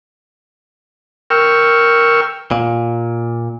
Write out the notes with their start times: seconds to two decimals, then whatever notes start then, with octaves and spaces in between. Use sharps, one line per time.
1.30 A#4 G5 C#6 E6 F6
2.51 A#2